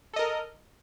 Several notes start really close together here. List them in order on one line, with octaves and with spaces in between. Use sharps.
A4 D#5 A#4